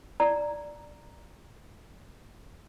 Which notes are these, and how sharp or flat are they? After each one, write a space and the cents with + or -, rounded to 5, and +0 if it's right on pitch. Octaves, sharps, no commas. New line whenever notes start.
D5 +0 A#5 +0